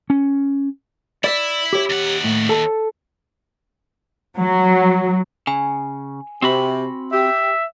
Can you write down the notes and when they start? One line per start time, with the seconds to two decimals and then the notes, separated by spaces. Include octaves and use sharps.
0.10 C#4
1.24 E4 D5 E5
1.73 G4 C#5
1.90 D#2 F#5
2.24 A2
2.49 A4 A5
4.39 F#3
5.47 C#3 G#5
6.42 C3 C4 F#4 B5
7.13 G4 E5